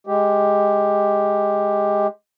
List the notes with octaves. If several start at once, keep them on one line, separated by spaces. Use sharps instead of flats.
G#3 G4